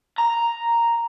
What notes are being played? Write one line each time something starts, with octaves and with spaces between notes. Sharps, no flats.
A#5